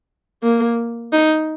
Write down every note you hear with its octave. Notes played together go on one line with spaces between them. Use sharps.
A#3
D#4